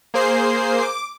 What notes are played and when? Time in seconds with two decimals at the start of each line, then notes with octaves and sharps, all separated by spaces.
0.14 A#3 G#4 C5 C7
0.82 D6